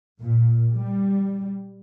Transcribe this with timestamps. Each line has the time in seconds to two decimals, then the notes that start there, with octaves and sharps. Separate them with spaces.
0.20 A#2
0.75 G3